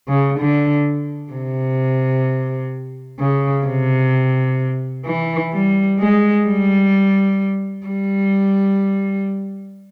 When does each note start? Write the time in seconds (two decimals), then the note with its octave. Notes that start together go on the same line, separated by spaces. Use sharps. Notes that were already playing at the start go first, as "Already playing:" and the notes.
0.08 C#3
0.39 D3
1.32 C3
3.19 C#3
3.66 C3
5.06 E3
5.53 G3
6.00 G#3
6.46 G3
7.86 G3